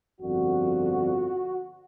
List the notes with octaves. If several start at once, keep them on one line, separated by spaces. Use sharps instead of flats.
G1 F2 D3 F3 F#4